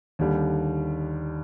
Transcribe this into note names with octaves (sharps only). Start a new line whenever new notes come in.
D#2 D3 G3